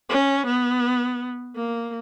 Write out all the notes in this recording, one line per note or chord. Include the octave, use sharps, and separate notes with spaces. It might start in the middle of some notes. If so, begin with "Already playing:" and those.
C#4
B3
A#3